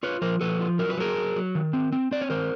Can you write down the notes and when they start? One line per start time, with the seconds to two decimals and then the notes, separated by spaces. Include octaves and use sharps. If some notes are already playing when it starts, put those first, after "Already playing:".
0.03 F4 B4 C#5
0.22 F3 A#4 C5
0.41 F3 A4 B4
0.60 F4
0.79 F#3 A#4
0.90 B4
0.98 F#3 G#4 A#4
1.16 F#3
1.36 F#3
1.55 D#3
1.73 C4
1.92 C4
2.11 C4 D5
2.21 C#5
2.30 D#3 A#4 C5